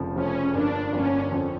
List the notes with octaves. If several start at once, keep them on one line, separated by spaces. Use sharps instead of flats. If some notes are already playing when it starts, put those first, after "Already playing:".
Already playing: F1 F2 C#3 F3
F1 F2 C#3 F3 C#4
G1 G2 F3 A#3 D4
G1 G2 F3 A#3 C#4
F2 D3 F3